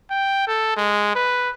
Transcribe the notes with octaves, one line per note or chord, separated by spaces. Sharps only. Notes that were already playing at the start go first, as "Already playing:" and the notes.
G5
A4
G#3
B4